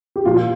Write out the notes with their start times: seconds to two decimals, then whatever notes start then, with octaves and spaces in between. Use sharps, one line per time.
0.16 G4
0.25 A#2 F3 F4